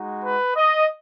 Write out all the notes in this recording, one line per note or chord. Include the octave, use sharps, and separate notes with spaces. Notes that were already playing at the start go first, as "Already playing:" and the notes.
Already playing: G#3 D#4 F#4
B4
D#5